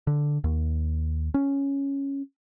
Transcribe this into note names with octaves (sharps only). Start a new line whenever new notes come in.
D3
D#2
C#4